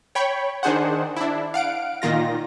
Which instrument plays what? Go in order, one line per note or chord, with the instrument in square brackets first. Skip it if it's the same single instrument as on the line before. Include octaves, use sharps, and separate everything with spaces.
[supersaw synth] C#5 G5 B5 C#6
D#3 D4 G#4 C5 F#5
D4 E4
F5 F#5 D7
A#2 D#3 F4 A#6